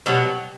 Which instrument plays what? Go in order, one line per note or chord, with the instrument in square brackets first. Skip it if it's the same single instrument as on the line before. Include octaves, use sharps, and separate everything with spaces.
[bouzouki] B2 F#3 B3 [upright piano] G3